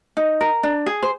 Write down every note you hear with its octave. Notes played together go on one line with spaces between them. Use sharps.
D#4
A#4
D4
G#4
C5